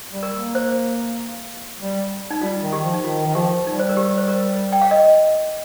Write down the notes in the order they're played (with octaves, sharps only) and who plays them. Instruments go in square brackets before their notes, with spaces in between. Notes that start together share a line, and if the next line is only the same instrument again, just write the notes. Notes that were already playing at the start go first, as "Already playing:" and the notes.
[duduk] G3
[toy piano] A#4
[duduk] A#3
[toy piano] C5
[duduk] G3
[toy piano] D#4
[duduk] G3 [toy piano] F4
[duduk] D#3
[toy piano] G4
[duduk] F3
[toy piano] D#4
[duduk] D#3 [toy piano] F4
[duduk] D#3
[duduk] F3 [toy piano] G4
[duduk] G3 [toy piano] D#4
[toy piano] C5
A#4
G4
C5
A#4
G5
F5
D#5